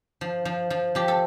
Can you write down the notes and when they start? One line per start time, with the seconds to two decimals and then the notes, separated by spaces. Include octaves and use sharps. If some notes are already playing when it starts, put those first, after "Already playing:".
0.21 F3
0.45 F3
0.70 F3
0.95 F3 G4
1.08 A4